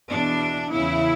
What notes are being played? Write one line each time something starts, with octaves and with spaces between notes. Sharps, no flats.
E2 B2 D4
E2 C#3 E3 E4